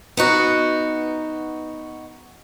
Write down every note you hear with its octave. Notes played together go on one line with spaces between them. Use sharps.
B3 D#4 F#4